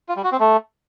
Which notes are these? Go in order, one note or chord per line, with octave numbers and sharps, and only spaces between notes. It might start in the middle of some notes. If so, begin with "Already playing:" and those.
F4
G3
F#4
C4
A3